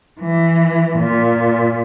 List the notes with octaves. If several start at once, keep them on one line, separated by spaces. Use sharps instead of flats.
E3
A#2